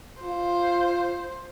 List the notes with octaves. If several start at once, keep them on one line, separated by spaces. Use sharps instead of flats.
F4 C5